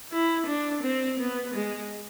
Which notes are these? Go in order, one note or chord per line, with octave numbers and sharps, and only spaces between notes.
E4
D4
C4
B3
G#3